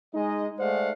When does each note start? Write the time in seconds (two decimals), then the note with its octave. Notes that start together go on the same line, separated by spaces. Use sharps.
0.14 G#3 D#4 D#5
0.58 G#3 A3 C5 D5 F5 F#5